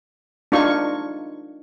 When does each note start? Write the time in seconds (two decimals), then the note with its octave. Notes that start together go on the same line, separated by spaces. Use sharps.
0.52 D4 D#4 F4 C#6